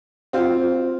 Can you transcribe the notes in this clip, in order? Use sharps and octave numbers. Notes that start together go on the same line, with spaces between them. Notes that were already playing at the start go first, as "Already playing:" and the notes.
C4 F4